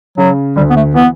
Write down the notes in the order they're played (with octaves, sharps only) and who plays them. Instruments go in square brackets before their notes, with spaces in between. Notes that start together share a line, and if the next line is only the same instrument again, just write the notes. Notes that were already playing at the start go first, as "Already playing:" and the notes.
[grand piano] C#3 [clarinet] F#3
[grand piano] D2 D3 [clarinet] G3
[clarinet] B3
A3
[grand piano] E3 [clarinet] B3